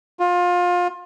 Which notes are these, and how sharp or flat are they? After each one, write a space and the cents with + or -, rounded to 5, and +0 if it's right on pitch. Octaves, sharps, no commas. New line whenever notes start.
F4 +25